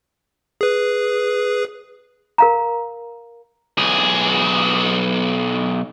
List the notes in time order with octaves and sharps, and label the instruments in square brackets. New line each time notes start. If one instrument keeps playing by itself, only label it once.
[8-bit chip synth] G#4 B4
[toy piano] A#4 F5 A#5
[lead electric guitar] B1 G#4